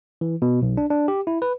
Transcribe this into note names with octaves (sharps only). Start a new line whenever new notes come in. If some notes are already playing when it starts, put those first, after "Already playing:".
E3
B2
B1
D4
D4
G4
E4
B4